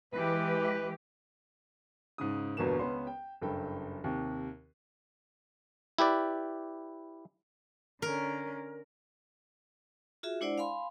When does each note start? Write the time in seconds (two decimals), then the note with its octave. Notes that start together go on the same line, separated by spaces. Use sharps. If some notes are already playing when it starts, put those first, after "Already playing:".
0.14 E3 G#3 G4 B4
2.18 G#2 C#3 D#6
2.57 G1 E2 B2 A#3 E7
2.79 C#2 B3 C#4 C6
3.07 G5
3.42 F#1 G2 A4 G5
4.04 D#2 C3
5.99 E4 G4 B4 D5
8.02 D3 C#4 A#4
10.23 F4 F#4 G#4 E5
10.41 G#3 D4 E4 C5 D5 F#5
10.58 F5 G#5 B5 C6